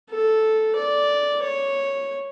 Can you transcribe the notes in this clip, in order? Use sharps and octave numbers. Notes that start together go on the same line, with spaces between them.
A4
D5
C#5